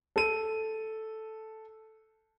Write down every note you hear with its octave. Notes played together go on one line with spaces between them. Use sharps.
A4 D#7